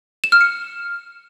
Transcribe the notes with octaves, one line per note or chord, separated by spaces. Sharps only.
E7
F6
C#7